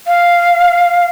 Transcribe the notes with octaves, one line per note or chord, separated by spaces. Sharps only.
F5